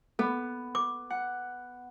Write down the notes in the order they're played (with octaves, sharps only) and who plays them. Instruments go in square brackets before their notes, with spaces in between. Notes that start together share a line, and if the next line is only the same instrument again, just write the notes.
[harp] B3 [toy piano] A4
[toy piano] D6
[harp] F#5